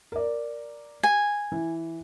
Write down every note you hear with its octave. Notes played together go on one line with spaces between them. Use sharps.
A#4 D5
G#5
E3